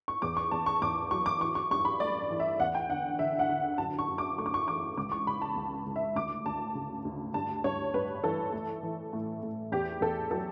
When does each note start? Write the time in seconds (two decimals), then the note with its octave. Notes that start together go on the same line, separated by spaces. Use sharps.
0.08 C#6
0.22 E2 D6
0.37 C#6
0.51 E2 A5
0.66 C#6
0.82 E2 D6
1.11 F#3 C#6
1.26 D6
1.41 E3 C#6
1.55 C#6
1.71 G2 C#6
1.85 B5
2.00 A3 D5
2.30 E3
2.40 E5
2.60 E2 F#5
2.75 G5
2.89 D3 F#5
3.19 D3 E5
3.39 F#5
3.49 D3
3.78 F#2 A5
3.99 C#6
4.08 F#2
4.18 D6
4.38 A3 C#6
4.46 D6
4.54 C#6
4.68 E3 D6
4.97 C#2 D6
5.12 C#6
5.27 C#3 B5
5.42 A5
5.56 C#2
5.87 C#2
5.96 E5
6.15 D2 D6
6.46 D2 A5
6.75 C#3
7.05 D2
7.34 G2 A5
7.64 G2 C#5
7.94 G2 B4
8.24 E3 A4
8.53 A3
8.83 E3
9.13 A2
9.43 A2
9.72 E2 G4
10.01 E2 A4
10.31 F#3 A4